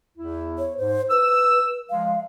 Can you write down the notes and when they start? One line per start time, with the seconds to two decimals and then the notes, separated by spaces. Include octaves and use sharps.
0.18 E2 E4
0.59 C#5
0.77 G#2 C5
1.11 B4 E6
1.90 F3 G#3 F5